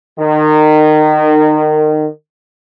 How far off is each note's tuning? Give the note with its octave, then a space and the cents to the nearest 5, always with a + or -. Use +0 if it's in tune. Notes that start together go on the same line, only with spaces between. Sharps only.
D#3 -25